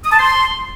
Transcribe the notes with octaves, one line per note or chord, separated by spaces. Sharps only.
D#6
A5
C6